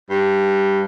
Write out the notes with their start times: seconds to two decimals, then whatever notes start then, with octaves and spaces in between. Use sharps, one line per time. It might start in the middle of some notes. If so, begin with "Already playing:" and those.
0.10 G2